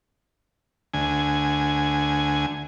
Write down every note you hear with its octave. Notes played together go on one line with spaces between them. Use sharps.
D2 G#5